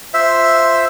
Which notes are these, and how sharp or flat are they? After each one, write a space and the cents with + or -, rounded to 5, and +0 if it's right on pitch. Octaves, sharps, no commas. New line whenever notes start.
F4 +0 C5 +0 E5 +0